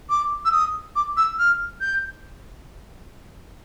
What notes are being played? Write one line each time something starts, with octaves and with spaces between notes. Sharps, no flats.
D6
E6
D#6
D6
E6
F6
G6